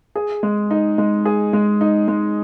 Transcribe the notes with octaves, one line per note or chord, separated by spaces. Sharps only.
G#4
G#3
D#4
G#3
G#4
G#3
D#4
G#3